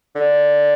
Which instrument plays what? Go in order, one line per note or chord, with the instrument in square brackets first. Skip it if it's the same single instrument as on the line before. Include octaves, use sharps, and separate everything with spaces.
[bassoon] D3